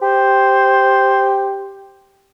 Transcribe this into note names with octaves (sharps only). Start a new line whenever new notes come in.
G4 C5